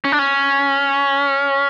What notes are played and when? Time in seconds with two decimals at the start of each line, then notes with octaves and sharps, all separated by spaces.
0.04 C#4
0.12 D4
0.19 C#4